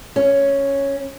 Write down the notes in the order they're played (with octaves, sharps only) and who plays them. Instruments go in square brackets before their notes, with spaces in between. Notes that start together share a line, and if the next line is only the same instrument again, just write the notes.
[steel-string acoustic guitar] C#4